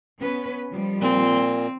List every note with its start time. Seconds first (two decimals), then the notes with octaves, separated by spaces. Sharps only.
0.20 B3 C#4 B4
0.69 D#3 F3 G3
1.01 A#2 C4